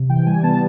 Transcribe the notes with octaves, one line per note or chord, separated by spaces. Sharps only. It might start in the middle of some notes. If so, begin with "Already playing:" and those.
Already playing: C3
E3 G5
G3 G#5
B3 A5